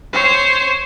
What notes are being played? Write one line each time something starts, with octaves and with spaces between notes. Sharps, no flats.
C5 C#5